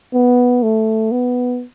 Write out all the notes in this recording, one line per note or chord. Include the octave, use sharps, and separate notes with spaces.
B3
A3
B3